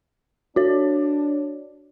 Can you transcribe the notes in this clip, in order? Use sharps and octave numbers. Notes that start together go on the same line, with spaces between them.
D4 F#4 C#5